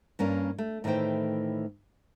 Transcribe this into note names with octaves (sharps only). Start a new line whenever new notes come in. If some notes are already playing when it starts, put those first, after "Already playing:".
G2 A#3 C#4 A#4 D5
A3
A2 D#3 E3 A3 C5 G5